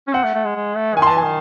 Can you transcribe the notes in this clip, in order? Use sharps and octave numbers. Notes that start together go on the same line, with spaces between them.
C#4
C4 F#5
A3
A3
G#3
G#3
A3
D#3 G#5
C6
E3 A5
G#5
D#3